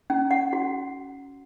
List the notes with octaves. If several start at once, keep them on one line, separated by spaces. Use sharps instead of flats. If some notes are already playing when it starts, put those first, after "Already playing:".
C#4
F#5
F#4